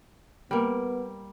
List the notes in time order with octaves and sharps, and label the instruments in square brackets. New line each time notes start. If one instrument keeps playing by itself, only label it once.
[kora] G3 A#3 [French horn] B3